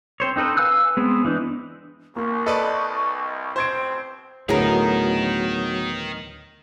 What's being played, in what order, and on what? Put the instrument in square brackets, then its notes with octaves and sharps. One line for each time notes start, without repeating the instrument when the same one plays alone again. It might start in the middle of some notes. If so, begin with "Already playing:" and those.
[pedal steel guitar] C4 C5 C#5
C4 D#4 A4 B4 C5
B4 F5 G#5 E6 F#6
G#3 B3 C4
E3 D4 D#4
[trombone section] C2 [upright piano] A#3 [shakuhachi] C#6
[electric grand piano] A4 B4 D5 [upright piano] D#5
[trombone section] A1 B2 C4 [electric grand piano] C5 [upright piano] C6 G#6 D7
[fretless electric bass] D2 A2 [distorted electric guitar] D#3 D#4 [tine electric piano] F#3 B3 [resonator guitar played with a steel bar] G#4 A#4